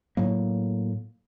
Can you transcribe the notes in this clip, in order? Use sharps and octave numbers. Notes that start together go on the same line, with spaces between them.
A2 F#3 A#3